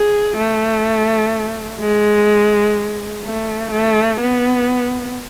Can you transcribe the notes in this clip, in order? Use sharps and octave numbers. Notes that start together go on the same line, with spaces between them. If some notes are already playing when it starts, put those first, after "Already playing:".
Already playing: G#4
A3
G#3
A3
A3
B3